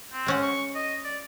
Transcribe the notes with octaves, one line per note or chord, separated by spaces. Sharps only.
C4
G#3 C#4 F#5
C#6
D#5
D5